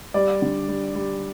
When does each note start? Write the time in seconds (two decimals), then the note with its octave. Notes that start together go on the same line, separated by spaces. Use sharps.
0.14 G3 D5
0.42 D3
0.69 G3
0.95 G3